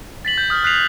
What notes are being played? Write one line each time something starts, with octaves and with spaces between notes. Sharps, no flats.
A6 B6 F#7
G6
D#6 F6
F6 F#6 B6 C7 F7